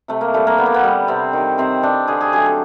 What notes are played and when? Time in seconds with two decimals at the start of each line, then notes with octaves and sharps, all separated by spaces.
0.08 C3 A3
0.21 A#3
0.34 E3 G3 A3
0.47 A#3
0.58 D3 B3
0.66 A#3
0.74 B3
0.84 G3
1.08 C3 C4
1.33 D#3 G3
1.58 C3 C4
1.83 E3 G3 D4
2.08 D3 G#4
2.21 G#4
2.33 F#3 A3 G#4
2.46 A4